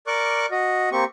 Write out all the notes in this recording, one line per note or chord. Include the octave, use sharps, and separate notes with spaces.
A#4 D5 C#6 D6 F#6
F#4 D#5
A#3 C4 G4 C#6